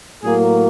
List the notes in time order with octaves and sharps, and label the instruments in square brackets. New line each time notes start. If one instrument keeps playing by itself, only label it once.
[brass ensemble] A2 F#3 A#3 G#4